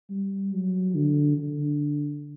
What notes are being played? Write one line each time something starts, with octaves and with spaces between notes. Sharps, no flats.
G3
F#3
D3
D3